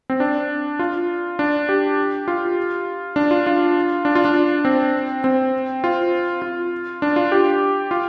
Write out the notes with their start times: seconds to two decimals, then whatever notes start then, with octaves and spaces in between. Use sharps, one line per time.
0.10 C4
0.20 D4
0.79 F4
1.39 D4
1.69 G4
2.28 F4
3.16 D4
3.31 F4
3.47 F4
4.05 D4
4.15 F4
4.25 D4
4.65 C4
5.24 C4
5.84 F4
6.42 F4
7.02 D4
7.16 F4
7.32 G4
7.91 F4